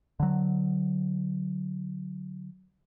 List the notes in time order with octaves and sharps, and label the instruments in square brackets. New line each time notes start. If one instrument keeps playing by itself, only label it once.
[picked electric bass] D3 F#3